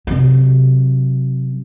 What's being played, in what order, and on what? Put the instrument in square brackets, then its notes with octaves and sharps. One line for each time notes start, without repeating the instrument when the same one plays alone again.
[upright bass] C3 F#3